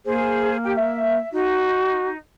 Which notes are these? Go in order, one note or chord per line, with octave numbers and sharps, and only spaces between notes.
A#3 G#4 C5
G4 G5
E5
D#4 F#4